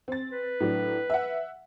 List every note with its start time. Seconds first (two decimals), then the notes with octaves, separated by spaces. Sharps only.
0.08 C4 A6
0.32 B4
0.60 A2 F#3 D4
1.10 E5 F#5